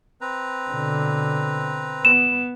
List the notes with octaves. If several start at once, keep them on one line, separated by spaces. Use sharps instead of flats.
C4 B4 A#5
B2 D3
B3 E7